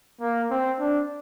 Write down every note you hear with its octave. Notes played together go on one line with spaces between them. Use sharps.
A#3
C4
D4